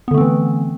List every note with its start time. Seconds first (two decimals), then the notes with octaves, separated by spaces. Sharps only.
0.08 B3
0.11 D3
0.14 A3
0.18 C4
0.21 E3